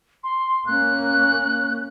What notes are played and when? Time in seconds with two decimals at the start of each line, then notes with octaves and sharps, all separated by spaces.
0.23 C6
0.66 A#3 C#4 F#6